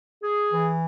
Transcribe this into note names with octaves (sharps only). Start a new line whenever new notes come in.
G#4
E3